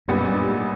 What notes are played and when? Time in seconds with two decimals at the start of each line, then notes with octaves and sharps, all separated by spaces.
0.08 B1 F#2 A#2 G3 B3
0.28 G2
0.47 G#2